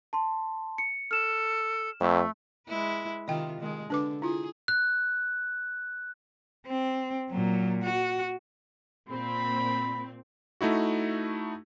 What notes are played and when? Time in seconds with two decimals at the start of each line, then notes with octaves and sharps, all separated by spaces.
0.13 A5 C6
0.78 C#7
1.11 A4 F6 E7
2.00 F2 A3
2.67 G#3 E4 B4
3.28 C3 D#3 F4 D#5 G5
3.60 D#3 G#3
3.90 D3 D4 B4 D6
4.22 E4 F4 G#4
4.68 F#6
6.67 C4
7.30 A#2 F#3
7.83 F#4
9.10 A#2 C4 B5
10.61 A3 D#4 E4 F#4